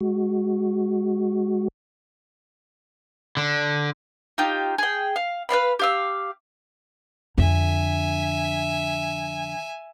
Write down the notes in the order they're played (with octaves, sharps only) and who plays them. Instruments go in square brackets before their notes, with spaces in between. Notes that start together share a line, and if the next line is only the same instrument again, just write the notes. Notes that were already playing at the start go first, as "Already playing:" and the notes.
[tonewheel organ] G#3 F#4
[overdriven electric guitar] D3
[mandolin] D#4 F4 G4
G#4 G5
F5
B4 D5 F5 B5
G4 F5 E6
[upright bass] F2 D3 [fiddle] E5 G#5